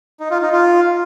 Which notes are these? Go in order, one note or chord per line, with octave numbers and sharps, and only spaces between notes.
D#4
F4
D#4
F4